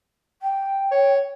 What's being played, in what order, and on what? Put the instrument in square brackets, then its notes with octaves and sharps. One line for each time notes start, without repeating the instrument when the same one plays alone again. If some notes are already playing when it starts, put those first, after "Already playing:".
[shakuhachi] G5
[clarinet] C#5